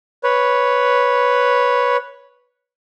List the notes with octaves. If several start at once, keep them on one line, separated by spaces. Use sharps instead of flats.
B4 C#5